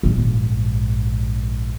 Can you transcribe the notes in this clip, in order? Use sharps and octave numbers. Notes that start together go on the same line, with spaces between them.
A#1 G#2